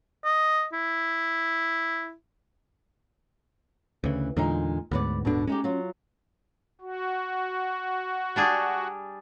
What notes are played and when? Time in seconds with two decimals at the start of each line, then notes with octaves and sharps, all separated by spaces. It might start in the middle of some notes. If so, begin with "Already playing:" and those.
0.25 D#5
0.73 E4
4.04 D2 C#3 E3
4.37 E2 A#2 D3 G#3 D#4
4.91 D2 G#2 B3 B4 D5
5.25 D#1 G#2 B2 D3 D4
5.47 G#3 C#4 D#4 G4
5.64 F#3 F4
6.81 F#4
8.36 G3 D4 G#4